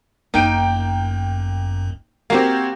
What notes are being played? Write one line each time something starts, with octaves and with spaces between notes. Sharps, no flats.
G1 F#2 A#3 D#4 G5 D7
A#3 C4 F#4 G4 F5 G#6